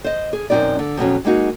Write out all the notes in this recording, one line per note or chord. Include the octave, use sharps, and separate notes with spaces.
C5 D#5
G#4
F#2 B2 D3 C4 D#4 D5
D3
F2 B2 F#3 C#4
G#3 A#3 D#4 F#4